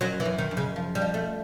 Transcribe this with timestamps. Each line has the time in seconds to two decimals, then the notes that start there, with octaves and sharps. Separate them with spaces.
0.01 F#2 F#3
0.20 E3
0.25 F#2
0.38 D#3
0.51 F#2
0.57 C#3
0.76 F3
0.95 G3
1.01 F3
1.14 A3